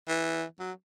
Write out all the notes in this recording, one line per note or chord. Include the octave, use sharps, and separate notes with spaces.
E3
F#3